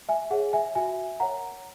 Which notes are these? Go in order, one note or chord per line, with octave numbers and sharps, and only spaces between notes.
E5 G#5
G#4 C#5 F#5
E5 G#5
F#4 E5 G#5
A#4 C#5 F#5 A#5